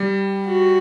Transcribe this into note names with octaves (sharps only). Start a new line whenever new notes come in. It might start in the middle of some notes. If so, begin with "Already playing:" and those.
Already playing: G3
F#4